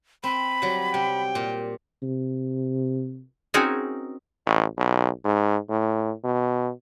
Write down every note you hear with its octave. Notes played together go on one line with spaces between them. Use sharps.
C4 B5
F#3 G3
C3 G5
A#2
C3
C4 C#4 D#4 F#4 G#4 A#4
A1
B1
G#2
A2
B2